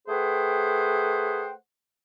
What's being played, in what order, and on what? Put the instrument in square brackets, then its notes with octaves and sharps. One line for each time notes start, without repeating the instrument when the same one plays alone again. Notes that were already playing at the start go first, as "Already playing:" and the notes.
[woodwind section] A3 G#4 B4 C5 F#5 G5